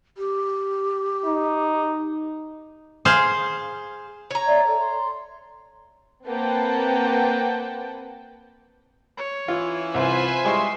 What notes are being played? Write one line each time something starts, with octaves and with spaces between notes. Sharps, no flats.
G4
D#4
G#4 C5 F5
C#5 A#5
D5 E5
A4
C6
A#3 C4 B4 F#5 G5 A5
C#5
E3 C#4 E4 F4
C2 F4 B4 C5 E5 G#5
G3 G#3 E4 F4 C6 C#6